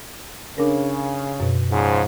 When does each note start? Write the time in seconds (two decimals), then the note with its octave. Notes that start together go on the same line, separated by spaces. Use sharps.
0.58 C#3 D4 A#4
1.40 F#2 B2
1.70 G#2 C#3 F3